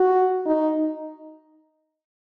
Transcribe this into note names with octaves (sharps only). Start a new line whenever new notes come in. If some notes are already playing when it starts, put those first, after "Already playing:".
Already playing: F#4
D#4